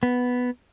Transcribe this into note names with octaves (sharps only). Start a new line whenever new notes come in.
B3